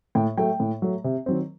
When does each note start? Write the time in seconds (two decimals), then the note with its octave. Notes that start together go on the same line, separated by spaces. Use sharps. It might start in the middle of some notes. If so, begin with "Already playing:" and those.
0.15 A2 G5
0.37 F#3 A3 G5
0.60 A2
0.82 F#3 A3
1.04 C3
1.26 D#3 F#3 C4